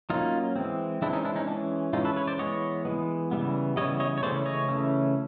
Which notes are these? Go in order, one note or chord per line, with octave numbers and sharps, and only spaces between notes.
F#3 A#3 C#4 D#4 F4
E3 G#3 C4
E3 G#3 C4 D4 E4
C#4 D#4
D4 E4
C#4 D#4
E3 G#3 C#4 D4
E3 G#3 C#4 D#4 F4
A4 B4
B4 C#5
C5 D5
E3 G#3 B3 C#5 D#5
E3 G#3 B3
C#3 E3 G3 B3
C#3 E3 G3 B3 C#5 D#5
C#5 D#5
C#5
C#3 E3 A3 C#4 C5 D5
C#5 D#5
C#3 E3 A3 C#4